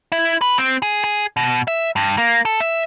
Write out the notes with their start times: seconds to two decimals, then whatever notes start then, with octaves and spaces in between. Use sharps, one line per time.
0.12 E4
0.41 B4
0.59 C4
0.82 G#4
1.04 G#4
1.37 B2
1.68 E5
1.96 G2
2.18 A#3
2.45 A4
2.60 E5